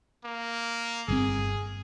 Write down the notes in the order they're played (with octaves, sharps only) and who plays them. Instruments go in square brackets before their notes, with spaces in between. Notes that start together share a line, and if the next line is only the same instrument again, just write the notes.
[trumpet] A#3
[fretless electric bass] G1 D3 C4 [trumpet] G#4